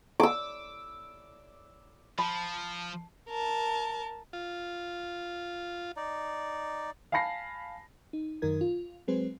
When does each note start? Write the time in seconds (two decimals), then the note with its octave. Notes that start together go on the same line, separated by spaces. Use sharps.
0.20 D6 E6
2.19 F3 A5 B5
3.29 A#4 A5
4.33 F4
5.96 D#4 D5
7.12 F5 G#5 A5 B5 A#6 C7
8.13 D#4
8.42 F#2 D#3 D#4 A#4 G#6
8.61 F4
9.08 F#3 G#3 C4 G#4 B4 C5